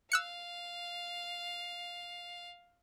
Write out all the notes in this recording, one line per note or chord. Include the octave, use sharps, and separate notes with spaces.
F5 E6 F#6 C#7